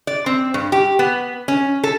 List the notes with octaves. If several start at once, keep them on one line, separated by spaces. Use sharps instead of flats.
D5
C4
G2
G4
B3
C#4
A4